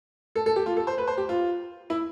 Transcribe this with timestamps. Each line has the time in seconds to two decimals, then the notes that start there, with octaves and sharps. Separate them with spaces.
0.36 A4
0.46 A4
0.56 G4
0.66 F4
0.77 A4
0.87 C5
0.98 B4
1.07 C5
1.17 G4
1.29 F4
1.90 E4